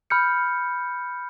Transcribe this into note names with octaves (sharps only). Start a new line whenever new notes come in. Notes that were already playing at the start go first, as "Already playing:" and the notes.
B5 F6 G6 C#7